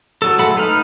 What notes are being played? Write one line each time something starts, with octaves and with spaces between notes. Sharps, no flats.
F#3 A4
G#3 A3 A4 F#5 B5
D#4 B4 F6